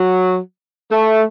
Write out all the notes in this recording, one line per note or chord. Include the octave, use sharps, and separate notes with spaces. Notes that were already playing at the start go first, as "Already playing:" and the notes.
Already playing: F#3
A3